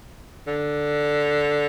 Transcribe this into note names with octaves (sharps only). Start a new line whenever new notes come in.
D3